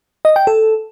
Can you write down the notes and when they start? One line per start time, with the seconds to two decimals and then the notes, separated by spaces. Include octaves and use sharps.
0.25 D#5
0.36 G5
0.47 A4